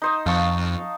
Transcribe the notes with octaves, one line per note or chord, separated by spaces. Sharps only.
D#4 C5 D#5
F2 F5 A5 C#6